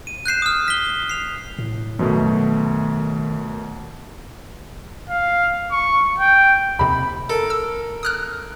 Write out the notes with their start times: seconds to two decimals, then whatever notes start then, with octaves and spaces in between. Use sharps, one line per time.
0.07 D#7
0.26 F#6 G6 C7 E7
0.42 D#6 F6
0.68 B6 G7
1.09 C7 F7
1.59 A2
1.99 F#2 B2 D#3 A3
5.09 F5
5.71 C#6
6.18 G5
6.79 D#2 C3 B5
7.30 A4 A#4
7.50 E6
8.03 D#6 F6 F#6